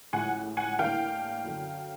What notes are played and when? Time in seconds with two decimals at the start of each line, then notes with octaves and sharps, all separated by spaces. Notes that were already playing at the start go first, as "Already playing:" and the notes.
0.13 A1 A2 F3 G#3 F#5 G#5
0.57 F#5 G#5
0.79 A2 E3 G3 A#3 D4 F5 G5
1.45 F#2 D3 F#3